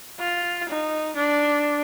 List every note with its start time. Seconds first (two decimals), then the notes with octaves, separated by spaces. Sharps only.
0.20 F4
0.69 D#4
1.16 D4